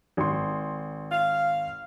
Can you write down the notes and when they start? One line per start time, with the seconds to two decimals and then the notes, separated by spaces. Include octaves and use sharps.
0.17 G#1 C6
1.11 F5